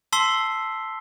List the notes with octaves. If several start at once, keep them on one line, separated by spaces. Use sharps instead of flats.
A5 C6 E6 B6 C7 G7